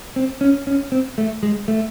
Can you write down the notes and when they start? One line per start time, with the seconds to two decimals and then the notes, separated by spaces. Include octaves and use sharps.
0.16 C4
0.41 C#4
0.67 C#4
0.92 C4
1.18 A3
1.43 G#3
1.68 A3